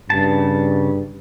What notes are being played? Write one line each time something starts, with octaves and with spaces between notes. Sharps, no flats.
G2 C#3 A5